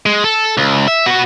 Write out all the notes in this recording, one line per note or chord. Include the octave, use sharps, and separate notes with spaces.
G#3
A4
C#2
E5
B3 F#4